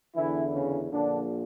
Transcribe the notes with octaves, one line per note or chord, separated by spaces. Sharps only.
E2 D3 E3 E4
C#3 C#4
A#1 A#2 D3 D4